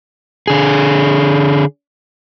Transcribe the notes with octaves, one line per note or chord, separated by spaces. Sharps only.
D3 G#4